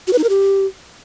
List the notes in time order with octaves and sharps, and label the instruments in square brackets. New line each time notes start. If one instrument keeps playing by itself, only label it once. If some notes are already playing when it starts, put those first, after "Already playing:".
[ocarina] F#4
B4
D#4
A#4
G4